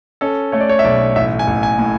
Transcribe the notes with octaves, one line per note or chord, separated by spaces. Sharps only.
C#4 A4
A3 C#5
D5
C#5
E5
B1 D5
A1 E5
G#5
A1
G#5
A2